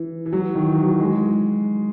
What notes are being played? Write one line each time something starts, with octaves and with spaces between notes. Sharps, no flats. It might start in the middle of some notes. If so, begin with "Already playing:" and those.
Already playing: E3
E3
F#3
D#3
E3
F#3
G#3